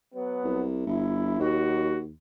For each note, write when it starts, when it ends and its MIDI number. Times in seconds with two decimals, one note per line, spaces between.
0.15 0.63 54
0.15 0.63 59
0.44 0.84 36
0.87 1.35 31
0.87 1.39 64
1.40 2.12 39
1.40 1.99 54
1.40 1.99 66